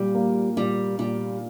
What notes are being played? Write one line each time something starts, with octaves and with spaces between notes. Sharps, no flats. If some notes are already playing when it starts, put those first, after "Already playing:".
Already playing: A#2 G3
A#3
A#2 G3
A#2 G3